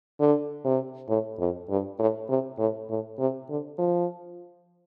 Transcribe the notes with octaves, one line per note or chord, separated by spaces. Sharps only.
D3
C3
A2
F2
G2
A2
C3
A2
A2
C3
D3
F3